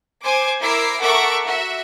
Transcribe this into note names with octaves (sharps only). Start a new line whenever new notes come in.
C5 G#5 D6
E4 A#4 D6 E6 C7
A4 A#4 E5 F#5 C#6 D6
F#4 E5